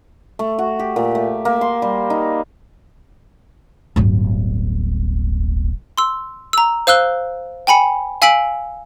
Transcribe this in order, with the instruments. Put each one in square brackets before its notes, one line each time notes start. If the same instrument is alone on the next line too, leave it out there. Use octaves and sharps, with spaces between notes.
[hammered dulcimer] A3
F#4
G4
A#2
A3
A#3
C6
G3
D#4
[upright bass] D1 G1
[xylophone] C6 E6
A#5 E6
C5 F5 E6 F#6 G7
G5 G#5 B5 C#7
F5 G#5 E6 B6 D7 F#7